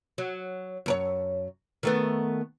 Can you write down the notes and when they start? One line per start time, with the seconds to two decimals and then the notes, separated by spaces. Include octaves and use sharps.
0.18 F#3
0.86 F#2 A#4 C#5
1.83 D#3 A3 B3